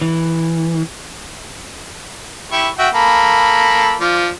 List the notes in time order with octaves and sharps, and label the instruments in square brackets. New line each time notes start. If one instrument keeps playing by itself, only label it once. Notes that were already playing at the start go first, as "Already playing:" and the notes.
[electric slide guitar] E3
[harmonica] E4 G4 C#6
F#4 E5 G5
A#3 A4 B5
F3 F4 D5